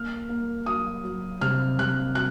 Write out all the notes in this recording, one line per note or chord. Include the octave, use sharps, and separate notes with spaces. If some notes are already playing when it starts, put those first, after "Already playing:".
Already playing: A#3 F6
A#3
F#3 D#6
F#3
C3 F6
C3 F#6
F#3 F#6